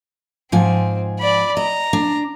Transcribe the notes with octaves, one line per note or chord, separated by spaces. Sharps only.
G#2 F3 C4 G#5
D5 B5
D#5 A#5
D4